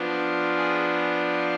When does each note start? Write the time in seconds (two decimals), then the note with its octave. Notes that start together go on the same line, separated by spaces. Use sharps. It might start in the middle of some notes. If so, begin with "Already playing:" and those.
Already playing: F3 B3 D4 F4
0.57 G#4